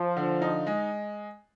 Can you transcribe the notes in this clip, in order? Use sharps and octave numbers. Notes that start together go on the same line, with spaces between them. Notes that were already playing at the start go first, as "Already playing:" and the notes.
Already playing: F3
D3
D#4
G#3